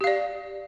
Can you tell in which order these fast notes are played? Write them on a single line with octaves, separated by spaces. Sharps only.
G4 F5 D5